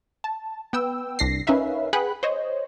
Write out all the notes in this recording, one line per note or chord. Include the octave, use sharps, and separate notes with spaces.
A5
B3 G5 E6
C2 D4 A#6 C7
C#4 D#4 A#4 B4 E5 F5
G#4 B4 F#5 G5 B5 F#6
C5 C#5 D#5